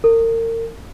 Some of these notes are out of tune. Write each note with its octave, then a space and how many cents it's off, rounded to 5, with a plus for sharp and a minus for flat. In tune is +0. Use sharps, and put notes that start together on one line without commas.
A#4 -35